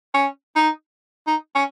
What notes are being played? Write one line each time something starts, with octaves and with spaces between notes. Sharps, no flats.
C#4
D#4
D#4
C#4